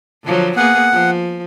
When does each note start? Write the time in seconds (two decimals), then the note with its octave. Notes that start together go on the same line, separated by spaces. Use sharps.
0.24 D3 F3 F#3
0.57 A#3 B3 G#4 F#5
0.92 F3